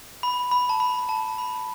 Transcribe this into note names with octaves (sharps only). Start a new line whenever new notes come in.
B5
B5
A5
B5
A5
B5